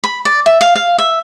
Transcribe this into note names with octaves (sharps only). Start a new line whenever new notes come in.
B5
D5
E5
F5
F5
E5